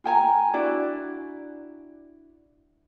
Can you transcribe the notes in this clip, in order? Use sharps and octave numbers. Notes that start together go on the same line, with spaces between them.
F4 G5 G#5 A#5
D4 E4 F#4 D5